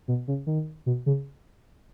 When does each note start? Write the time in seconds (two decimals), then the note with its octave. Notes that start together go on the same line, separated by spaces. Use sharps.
0.08 B2
0.28 C#3
0.47 D#3
0.86 B2
1.06 C#3